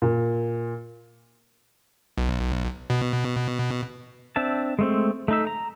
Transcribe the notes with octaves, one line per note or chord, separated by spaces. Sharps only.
A#2
B1
B2
C4 D4 E5 A5
G#3 A3 C4
A3 D#4 E5
A#5